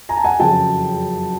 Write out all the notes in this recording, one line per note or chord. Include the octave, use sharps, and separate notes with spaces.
G#5 A#5
A5
F#5 G#5
F#1 F2 C#3 F#3 G5 A5